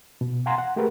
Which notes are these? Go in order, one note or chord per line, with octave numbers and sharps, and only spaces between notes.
B2
F5 F#5 G#5 A#5 C6
F#5
A3 G4 G#4 A#4 B4